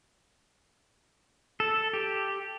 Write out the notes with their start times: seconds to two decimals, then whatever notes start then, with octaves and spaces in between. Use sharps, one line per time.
1.60 A4
1.93 G4